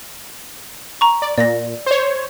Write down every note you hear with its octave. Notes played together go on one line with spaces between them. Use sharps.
A#5 C#6
D5
A#2 D5 A#6
C5 C#5